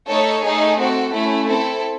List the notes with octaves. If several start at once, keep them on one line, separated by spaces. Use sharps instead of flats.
A3 D#4 A4 C#5
A3 D#4 G#4
C4 F#4 A4
A3 C#4 E4
C4 E4 A4